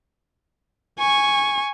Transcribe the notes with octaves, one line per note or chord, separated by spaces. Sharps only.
G#5 C#6